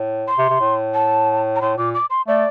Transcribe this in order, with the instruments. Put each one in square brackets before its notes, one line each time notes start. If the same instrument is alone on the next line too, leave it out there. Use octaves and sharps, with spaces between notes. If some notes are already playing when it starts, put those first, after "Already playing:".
Already playing: [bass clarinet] A2
[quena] C6
[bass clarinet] C3
C3
A2
[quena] A5
A#5
[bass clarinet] A2 [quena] C6
[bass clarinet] A#2 [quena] D6
[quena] D6
C6
[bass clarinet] A3 [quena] D5